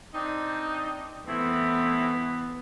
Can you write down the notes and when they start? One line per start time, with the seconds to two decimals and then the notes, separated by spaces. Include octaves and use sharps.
0.14 C4 D4 D#4
1.28 E3 A3 B3 C4 E4